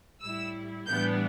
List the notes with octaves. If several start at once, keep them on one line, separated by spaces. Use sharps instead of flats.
A2 G3 E4 E6
A2 E3 G3 B3 D4 G6